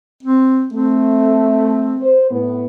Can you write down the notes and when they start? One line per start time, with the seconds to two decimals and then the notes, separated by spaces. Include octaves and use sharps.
0.23 C4
0.73 A3 C4
2.00 C5
2.31 A2 B3